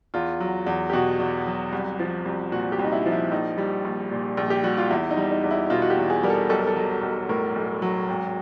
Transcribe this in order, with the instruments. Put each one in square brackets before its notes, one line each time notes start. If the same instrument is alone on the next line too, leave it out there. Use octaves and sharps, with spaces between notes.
[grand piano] E2 F4
F#3
E2
G4
B2 F#4
E2
F#3
C2
F3
C2
A#2 F#4
G4
C2
D#4
E4
F3
E4
A#1 D#4
G3
A#1
A#2
A#1
G4
G3 F#4
F4
E2 E4
D#4
G3
D#4
E2
E4
B2 F4
F#4
G4
E2
G#4
G3 A#4
A4
B1 A4
A#4
A4
F#3
B1
A2 A#4
B1
F#3
G#1